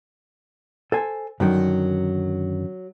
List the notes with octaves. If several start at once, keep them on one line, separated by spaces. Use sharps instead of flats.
A4 C5 G#5
F#2 D3 D#3 F#3